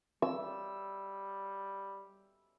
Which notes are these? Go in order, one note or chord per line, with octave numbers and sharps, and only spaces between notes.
G3 E6